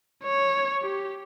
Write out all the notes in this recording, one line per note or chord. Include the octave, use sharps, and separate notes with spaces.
C#5
G4